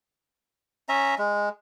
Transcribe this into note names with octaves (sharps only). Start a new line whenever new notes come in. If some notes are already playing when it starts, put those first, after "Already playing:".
C#4 E5 A#5
G#3